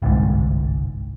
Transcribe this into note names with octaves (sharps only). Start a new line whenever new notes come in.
G1 C2 G#2